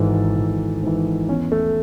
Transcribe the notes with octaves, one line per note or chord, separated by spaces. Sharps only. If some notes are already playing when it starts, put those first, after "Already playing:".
Already playing: G#1 G#2 E3 A4
G#1
G#2 E3
E2 C#4
A3